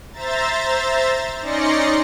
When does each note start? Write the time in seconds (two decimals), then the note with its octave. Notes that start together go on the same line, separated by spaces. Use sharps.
0.13 C5 E5 A#5 A6
1.41 C#4 D#4 D5 C6 A#6 C#7